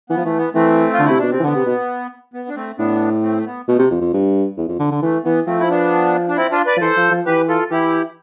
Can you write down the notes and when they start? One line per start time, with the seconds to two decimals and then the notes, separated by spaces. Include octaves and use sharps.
0.10 E3 B3
0.17 F3
0.24 E3 A3
0.38 B3
0.54 E3 A3 C4
0.93 F4
0.99 D3
1.05 C3 E4
1.18 B2 D4
1.31 C3 C4
1.39 E3
1.43 D3 B3
1.55 C3
1.66 B2
2.34 B3
2.49 D4
2.56 A3 C4
2.78 A2 B3 D4
3.23 A3 C4
3.37 A3
3.46 B3
3.68 B2 A3
3.79 C3
3.91 F2
4.01 F2
4.13 G2
4.57 E2
4.68 F2
4.79 D3
4.92 D3
5.02 E3 A3
5.24 E3 B3
5.47 F3 A3 C4
5.60 E4
5.70 B3 D4
6.29 D4
6.36 C4 E4
6.51 D4 F4
6.66 B4 D5
6.77 F3
6.81 E3 A4 C5
6.97 F3
7.11 F3
7.26 E3 G4 B4
7.48 F4 A4
7.71 E3 E4 G4